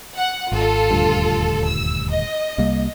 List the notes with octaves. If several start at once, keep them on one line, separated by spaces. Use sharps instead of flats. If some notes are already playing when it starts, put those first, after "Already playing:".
F#5
G#1 F4 A4
D#1 D2 G2
E6
D#5
C2 G3 A#3